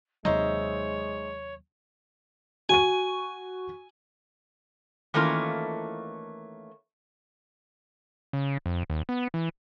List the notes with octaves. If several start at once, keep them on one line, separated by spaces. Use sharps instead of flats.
D#2 C3 F#3 G#3 D#4 C5 C#5 E5
F#4 G#5 C#6 D#7
D#3 E3 A3 A#3 C#4 F4
C#3
F2
D#2
B3
E3